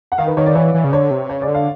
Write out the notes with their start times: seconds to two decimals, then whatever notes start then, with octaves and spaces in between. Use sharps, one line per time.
0.12 F#5
0.18 D#3 F5
0.27 B4
0.37 D#3 C#5
0.46 D5
0.55 E3 C#5
0.74 E3
0.84 C#3
0.93 D3 C#5
1.11 C3
1.29 C#3 C#5
1.42 D5
1.48 D3
1.54 F5